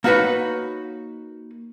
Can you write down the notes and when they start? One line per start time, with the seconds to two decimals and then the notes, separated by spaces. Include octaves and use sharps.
0.04 A#3 D#4 F#4 B4 C#5